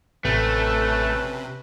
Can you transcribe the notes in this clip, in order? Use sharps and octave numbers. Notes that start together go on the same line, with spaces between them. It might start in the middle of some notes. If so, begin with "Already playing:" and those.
A1 C3 F3 A3 C#4 B4